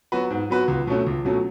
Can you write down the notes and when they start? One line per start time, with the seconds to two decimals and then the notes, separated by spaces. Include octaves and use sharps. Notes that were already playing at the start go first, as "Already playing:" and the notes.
0.12 F#3 B3 F#4 B4
0.30 G#2
0.50 F#3 B3 F#4 B4
0.68 C#2
0.87 B2 F#3 A3 C#4
1.07 C#2
1.25 B2 F#3 A3 C#4